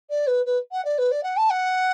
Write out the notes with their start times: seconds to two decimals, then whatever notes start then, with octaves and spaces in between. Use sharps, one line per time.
0.10 D5
0.27 B4
0.46 B4
0.72 F#5
0.85 D5
0.98 B4
1.11 D5
1.23 F#5
1.37 A5
1.50 F#5